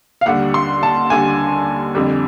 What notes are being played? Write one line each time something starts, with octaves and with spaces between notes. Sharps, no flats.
F5
D#2 D3 G3 F#5
C6
A5
D#2 D3 G3 G#5
F2 D3 G3